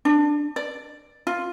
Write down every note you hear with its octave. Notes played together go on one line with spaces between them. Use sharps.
D4
D5
F4